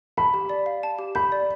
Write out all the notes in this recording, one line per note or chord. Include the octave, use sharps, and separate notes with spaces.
A5 B5
G4
D5
F5
A5
G4
B5 G6
D5